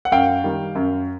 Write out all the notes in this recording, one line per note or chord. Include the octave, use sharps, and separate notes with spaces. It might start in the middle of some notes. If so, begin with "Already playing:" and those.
F#5
F#2 F5 G5
D#3 G3
F#2